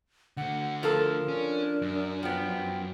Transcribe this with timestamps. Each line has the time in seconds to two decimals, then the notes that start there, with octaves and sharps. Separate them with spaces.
0.37 D3 A3 F#5
0.83 F3 F4 A4 A#4
1.28 C#4 D4
1.82 F#2
2.23 F3 B3 G5